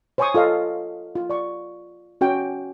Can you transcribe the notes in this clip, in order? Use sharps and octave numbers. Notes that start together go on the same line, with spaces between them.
C5 C#5 G#5 C6 C#6 D#6
F4 A4 D#5 F5
F4
D5 C#6
C#4 F#4 G5